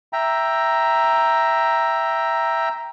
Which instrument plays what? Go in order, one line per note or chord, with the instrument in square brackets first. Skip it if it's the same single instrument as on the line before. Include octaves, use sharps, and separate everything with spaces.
[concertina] E5 G5 A#5